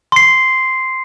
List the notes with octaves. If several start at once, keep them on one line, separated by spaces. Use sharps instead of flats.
C6 C7